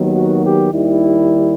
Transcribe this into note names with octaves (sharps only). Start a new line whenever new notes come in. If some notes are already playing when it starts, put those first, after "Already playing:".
Already playing: D#2 D#3 F#3 B3
F#4
G4
D#2 D#3 G3 E4